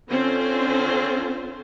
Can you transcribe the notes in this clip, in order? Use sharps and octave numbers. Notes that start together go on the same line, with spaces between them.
D3 C4 C#4 F4 A4 C5